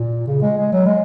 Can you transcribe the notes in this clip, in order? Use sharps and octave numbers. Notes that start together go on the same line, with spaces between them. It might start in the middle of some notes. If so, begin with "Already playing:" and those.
Already playing: A#2
C#3
G#3
G#3
F#3
G#3